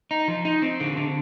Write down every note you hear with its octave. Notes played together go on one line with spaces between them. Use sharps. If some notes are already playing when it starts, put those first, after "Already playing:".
D#4
F3
D#4
C4
D3
D3